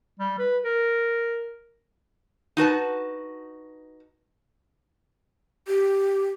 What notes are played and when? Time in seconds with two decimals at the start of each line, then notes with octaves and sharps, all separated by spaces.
0.19 G3
0.39 B4
0.64 A#4
2.57 D#4 F#4 B4 A5
5.67 G4